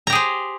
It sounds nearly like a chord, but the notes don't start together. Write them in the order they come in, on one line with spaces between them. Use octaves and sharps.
A#5 G4 G#4 C5